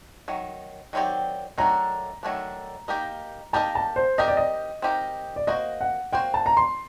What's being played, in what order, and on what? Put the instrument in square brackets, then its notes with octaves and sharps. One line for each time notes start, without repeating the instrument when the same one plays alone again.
[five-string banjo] D#3 F#3
D#3 F#3 C4 G4 D5
[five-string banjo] D#3 F#3 A3 D4 [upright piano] A#5
[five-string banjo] D#3 F#3 A3 D4
A#3 D#4 G4 A#4 D#5
[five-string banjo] A#3 D#4 G4 A#4 D#5 [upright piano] A5
[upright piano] A5
C5
[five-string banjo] C4 D#4 G4 A#4 [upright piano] D#5
[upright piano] D5
D#5
[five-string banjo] C4 D#4 G4 A#4
[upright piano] D5
[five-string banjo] A#3 F#4 C5 [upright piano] D#5
[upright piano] F#5
[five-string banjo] A#3 F#4 C5 [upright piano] G5
[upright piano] A5
A#5
C6